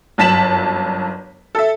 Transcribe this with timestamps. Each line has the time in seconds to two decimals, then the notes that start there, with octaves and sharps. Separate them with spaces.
0.18 G1 F#2 A5 B6 E7 F#7
1.55 A4 E5